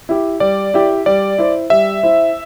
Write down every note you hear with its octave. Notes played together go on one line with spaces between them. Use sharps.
E4 G4
G3 D5
E4 G4
G3 D5
E4 C5
G3 E5
E4 C5